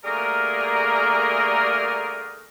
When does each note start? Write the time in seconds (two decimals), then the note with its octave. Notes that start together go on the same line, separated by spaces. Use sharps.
0.05 D3 G3 A3 A#3 G#4 A#4